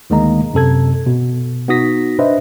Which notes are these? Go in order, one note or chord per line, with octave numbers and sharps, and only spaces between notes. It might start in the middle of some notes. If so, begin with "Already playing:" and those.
D2 D#3 G#3 A#3 D#5 A#5
F#2 C3 A4 G#6
B2
B3 D#4 F#4 D#6 A#6 B6
D4 B4 C5 D#5 E5